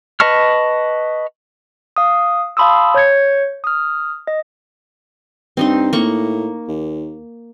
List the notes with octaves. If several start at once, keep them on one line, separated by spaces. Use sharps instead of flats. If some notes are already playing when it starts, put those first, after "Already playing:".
B4 D#5 A5 C#6 F6
F5 D#6
F5 A5 B5 C6 D#6 E6
C#5 G6 G#6 C#7
D#6 F6
D#5
G2 C4 D#4 C6
A2 A#3 C#6
D#2